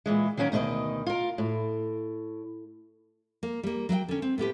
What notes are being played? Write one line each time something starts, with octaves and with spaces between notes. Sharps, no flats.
A#2 E3 G#3
D#3 F#3 A#3 C#4 A#4
D2 B2 D#3 D#4 D#5
F4 A#4
A2
A#3
G3 A#3
F#3 A#4 E5 G5
D3 C#4
C4
A2 B3 G4 B4